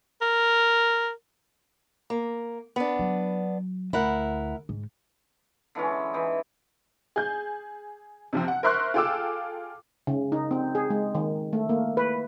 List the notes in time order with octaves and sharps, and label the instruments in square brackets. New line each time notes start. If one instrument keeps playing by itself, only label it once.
[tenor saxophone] A#4
[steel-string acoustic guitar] A#3
B3 D4
[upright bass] F#3
[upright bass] D2 [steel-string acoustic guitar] E4 A#4 F#5
[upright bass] G#2
[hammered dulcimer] D3 E3 G#3 C#4
E3 D#4
[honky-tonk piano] G#4 G6
C3 F3 C4
F#5
A#4 C5 E5 C6 C#6 F#6
F4 G#4 A4 G5 D6 E6
[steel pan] C#3
D#4
C4
G#4
G#3
D#3
A3
A#3
B4